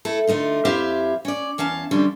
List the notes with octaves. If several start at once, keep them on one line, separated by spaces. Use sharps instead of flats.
A3 E4 A4
D3 A3 D#4 F4
F2 E4 G4 C5 E5 F5
C#4 D5
E2 C#4 F5 A5
D3 F3 G3 C#4 D4